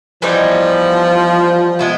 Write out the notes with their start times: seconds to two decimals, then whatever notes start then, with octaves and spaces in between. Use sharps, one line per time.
0.22 E3 F3 G3 B3 D#4
1.79 G#3 B3 E4